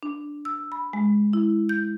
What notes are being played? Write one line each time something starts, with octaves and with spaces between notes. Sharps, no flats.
D4
E6
B5
G#3
E4
G6